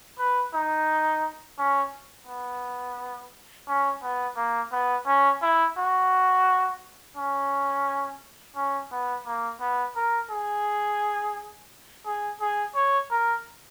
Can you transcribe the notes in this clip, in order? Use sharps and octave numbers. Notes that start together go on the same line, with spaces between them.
B4
D#4
C#4
B3
C#4
B3
A#3
B3
C#4
E4
F#4
C#4
C#4
B3
A#3
B3
A#4
G#4
G#4
G#4
C#5
A#4